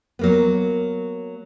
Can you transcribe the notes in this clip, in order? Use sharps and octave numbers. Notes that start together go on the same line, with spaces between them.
F#3 A#3 B3